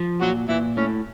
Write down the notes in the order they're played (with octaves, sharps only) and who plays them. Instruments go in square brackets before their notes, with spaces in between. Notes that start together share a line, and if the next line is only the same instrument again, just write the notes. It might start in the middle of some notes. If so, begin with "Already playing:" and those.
Already playing: [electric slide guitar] F3
[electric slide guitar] A#2 [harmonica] F#3 F#4
[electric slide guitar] A#2 [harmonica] E3 E4
[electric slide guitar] A2 [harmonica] C#4